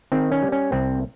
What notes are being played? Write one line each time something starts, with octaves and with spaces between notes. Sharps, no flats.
D#3 C4
C#4
G3
C#4
C2 C4